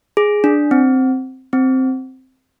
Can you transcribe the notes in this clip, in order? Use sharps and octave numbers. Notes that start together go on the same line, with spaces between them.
G#4
D4
C4
C4